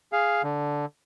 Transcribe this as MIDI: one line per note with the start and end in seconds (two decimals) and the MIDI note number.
0.12 0.42 68
0.12 0.42 77
0.43 0.85 50